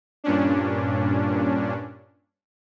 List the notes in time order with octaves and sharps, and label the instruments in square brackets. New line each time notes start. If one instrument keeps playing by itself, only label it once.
[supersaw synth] G2 A#2 C#4 D4